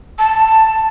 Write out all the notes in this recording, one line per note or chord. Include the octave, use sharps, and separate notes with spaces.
A5